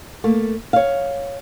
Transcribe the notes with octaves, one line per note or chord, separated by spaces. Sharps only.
A3 A#3
C#5 F5